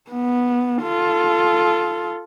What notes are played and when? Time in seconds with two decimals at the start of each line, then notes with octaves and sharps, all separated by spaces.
0.11 B3
0.83 F4 A4